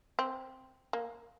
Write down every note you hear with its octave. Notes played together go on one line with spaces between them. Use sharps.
C4
A#3